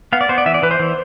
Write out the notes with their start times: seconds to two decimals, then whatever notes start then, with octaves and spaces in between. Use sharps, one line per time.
0.13 B3 F5
0.21 D5
0.29 B3 C5
0.38 D5
0.46 E3 E5
0.54 D5
0.62 E3 B4
0.71 C5
0.79 E3